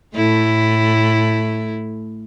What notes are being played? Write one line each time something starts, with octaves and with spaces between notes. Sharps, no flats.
A2 A3 E4